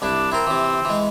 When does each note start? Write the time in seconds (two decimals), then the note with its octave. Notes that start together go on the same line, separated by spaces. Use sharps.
0.02 C2 D4 E4
0.32 C4 E4 A#4
0.47 C3 E3
0.85 E3 G#3